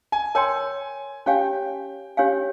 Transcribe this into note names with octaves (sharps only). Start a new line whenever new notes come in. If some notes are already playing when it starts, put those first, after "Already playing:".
G#5
A#4 C#5 G5 G#5 C6
C#4 G4 C#5 F5 G5 G#5
C#4 G4 C#5 F5 G#5